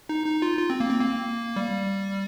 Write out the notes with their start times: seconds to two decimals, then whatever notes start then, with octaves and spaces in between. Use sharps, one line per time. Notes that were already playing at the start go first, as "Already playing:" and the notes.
0.09 D#4
0.26 D#4
0.42 F4
0.59 F4
0.70 C4
0.80 A#3
0.91 C4
1.00 A#3
1.56 G3